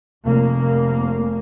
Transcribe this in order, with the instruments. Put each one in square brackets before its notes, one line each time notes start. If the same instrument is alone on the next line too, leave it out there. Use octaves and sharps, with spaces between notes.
[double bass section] F1 A#3